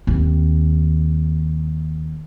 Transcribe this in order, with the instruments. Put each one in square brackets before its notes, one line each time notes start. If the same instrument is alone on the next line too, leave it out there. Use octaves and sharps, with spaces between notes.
[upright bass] D#2 C4